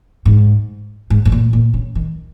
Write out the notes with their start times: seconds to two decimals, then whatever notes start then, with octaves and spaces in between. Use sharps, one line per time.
0.25 G#2
1.10 G#2
1.25 G#2
1.32 A#2
1.53 A#2
1.74 C#3
1.95 D#3